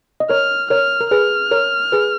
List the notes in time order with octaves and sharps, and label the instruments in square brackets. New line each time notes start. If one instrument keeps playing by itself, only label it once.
[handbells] D#5
[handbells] A#4 C#5 [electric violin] F6
[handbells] A#4 C#5 [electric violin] F6
[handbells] A#4
[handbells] G#4 B4 [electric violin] F6
[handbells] A#4 C#5
G#4 B4